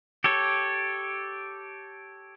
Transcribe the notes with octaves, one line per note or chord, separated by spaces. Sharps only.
G4 A4 C#5